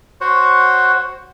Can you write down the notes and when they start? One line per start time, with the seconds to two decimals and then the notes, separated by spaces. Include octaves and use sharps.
0.21 F#4 C5 C#5 F#5